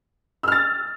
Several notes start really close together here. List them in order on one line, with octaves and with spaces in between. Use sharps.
E6 F6 A6